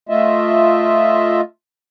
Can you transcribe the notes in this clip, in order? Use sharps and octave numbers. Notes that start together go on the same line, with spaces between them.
A3 F4 D#5 E5